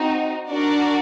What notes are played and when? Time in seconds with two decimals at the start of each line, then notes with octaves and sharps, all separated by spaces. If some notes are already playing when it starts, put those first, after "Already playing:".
Already playing: C4 D#4 F#4
0.48 D4 F#4 A#4 D5